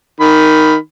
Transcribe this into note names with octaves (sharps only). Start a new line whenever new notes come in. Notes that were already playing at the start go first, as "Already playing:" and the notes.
D#3 B5